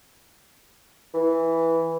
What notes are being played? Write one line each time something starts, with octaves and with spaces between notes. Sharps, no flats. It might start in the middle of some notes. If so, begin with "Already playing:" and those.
E3